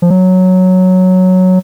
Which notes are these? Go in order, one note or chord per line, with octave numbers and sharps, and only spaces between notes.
F3
F#3